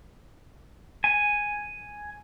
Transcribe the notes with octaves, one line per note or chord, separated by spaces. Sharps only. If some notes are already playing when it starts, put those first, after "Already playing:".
G#5